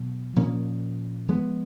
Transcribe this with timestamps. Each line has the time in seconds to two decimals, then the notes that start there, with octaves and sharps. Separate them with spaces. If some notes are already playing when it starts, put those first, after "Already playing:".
Already playing: B2 F#3
0.36 A#2 F3 A#3 C#4
1.28 F3 G#3 B3